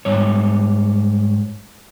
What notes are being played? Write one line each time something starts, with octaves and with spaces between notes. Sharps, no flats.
G#2 G3 C#5